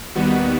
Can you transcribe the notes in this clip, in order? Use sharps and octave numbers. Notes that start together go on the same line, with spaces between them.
D#2 D#3 G3 B3 F#4